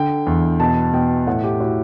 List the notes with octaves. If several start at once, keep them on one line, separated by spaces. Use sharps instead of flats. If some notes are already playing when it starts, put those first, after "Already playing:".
Already playing: D3 G5
E2
B2 A5
B2 G5
A2 F#5
G4
A2 F#4